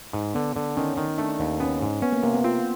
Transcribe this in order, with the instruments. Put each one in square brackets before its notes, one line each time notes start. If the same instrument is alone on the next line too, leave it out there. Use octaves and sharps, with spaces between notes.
[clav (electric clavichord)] G#2
[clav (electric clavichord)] D3 [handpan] B3
[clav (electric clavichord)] D3
[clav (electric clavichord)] D#3 [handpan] C#4
[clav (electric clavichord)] D#3
[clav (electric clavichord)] A3 [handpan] D4
[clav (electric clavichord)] D#2
[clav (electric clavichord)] B3 [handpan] C#4
[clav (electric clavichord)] G#2
[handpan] B3 [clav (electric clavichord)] C#4
[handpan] A#3
[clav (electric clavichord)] C3 [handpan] A#3
[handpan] B3
[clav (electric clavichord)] C4 [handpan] F4